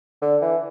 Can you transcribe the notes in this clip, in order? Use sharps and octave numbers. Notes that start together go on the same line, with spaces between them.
D3
E3